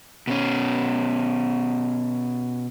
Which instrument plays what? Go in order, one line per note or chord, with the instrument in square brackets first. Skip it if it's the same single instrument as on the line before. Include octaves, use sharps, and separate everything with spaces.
[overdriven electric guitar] B2 C#4